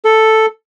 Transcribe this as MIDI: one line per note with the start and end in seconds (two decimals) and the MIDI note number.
0.05 0.46 69